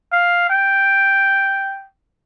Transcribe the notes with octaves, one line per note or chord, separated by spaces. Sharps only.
F5
G5